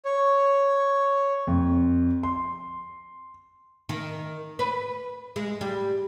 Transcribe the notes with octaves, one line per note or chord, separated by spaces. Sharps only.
C#5
F2
C6
D#3
B4
G#3
G3